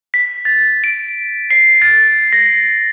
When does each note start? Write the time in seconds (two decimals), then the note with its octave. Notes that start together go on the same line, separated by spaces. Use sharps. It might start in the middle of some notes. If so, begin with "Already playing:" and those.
0.14 B6
0.45 A6
0.84 D7
1.51 C7
1.82 A6
2.33 A#6